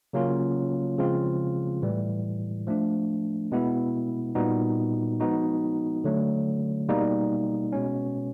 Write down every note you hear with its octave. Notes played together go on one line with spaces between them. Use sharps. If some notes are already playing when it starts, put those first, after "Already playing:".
C#3 F#3 A#3 C#4 F4
C#3 F3 G#3 C4 F4
A2 E3 G3
F3 A3 D4
B2 G#3 B3 E4
A#2 G3 B3 D#4 F#4
F3 G#3 B3 D#4 F#4
D3 F#3 A3
B2 G3 A#3 D#4
B2 G#3 C#4